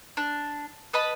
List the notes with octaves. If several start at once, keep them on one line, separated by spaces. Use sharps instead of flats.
D4
B4 D#5 A5 B5